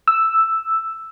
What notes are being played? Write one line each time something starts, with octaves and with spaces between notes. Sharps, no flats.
E6